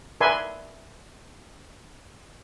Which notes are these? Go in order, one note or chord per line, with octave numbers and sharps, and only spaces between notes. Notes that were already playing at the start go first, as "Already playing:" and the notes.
A#4 B4 D5 E5 G#5 C6